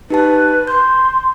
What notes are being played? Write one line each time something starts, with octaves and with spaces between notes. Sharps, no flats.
D#4 G4 B4 A5
C6 G6